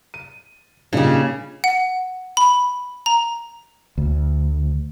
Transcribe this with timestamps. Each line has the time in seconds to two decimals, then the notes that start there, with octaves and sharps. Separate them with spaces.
0.14 D#7
0.93 A#2 C#3 G3 D4 D#4
1.64 F#5
2.37 B5
3.06 A#5
3.98 D2